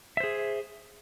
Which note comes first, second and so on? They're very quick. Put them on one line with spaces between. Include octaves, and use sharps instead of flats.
E5 C5 G#4